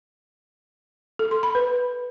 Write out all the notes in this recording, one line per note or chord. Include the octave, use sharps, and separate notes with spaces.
A4
C6
B5
B4